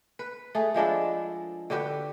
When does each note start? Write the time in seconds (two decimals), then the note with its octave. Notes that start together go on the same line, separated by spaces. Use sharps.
0.19 B4
0.55 A3 G#4
0.74 F3 G#3 D4 E4
1.70 D3 F#4 G4 B4